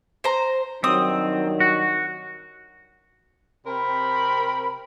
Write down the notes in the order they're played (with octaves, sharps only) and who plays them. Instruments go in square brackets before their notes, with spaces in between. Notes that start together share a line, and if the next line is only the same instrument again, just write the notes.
[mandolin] C5 A#5
[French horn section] G2 D#3 F#3 [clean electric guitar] C4 [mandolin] D#6
[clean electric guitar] F#4
[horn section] C3 C4 G4 A#4 B5